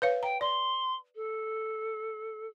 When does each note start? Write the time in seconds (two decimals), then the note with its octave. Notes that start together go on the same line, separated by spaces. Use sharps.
0.02 B4 C#5 F5
0.23 G5 A#5
0.41 D5 C6
1.16 A4